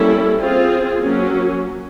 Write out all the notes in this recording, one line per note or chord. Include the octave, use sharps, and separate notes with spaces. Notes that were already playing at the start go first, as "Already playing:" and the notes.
Already playing: G3 A#3 C#4 E4 A4
C4 F4 G#4
F#3 A#3 C#4